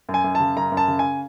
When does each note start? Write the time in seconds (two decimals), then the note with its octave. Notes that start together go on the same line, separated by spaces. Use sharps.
0.09 F#2
0.14 G#5
0.24 F#2
0.35 A5
0.40 C#3
0.57 F#2 A#5
0.72 F#2
0.77 A5
0.88 C#3
0.99 G#5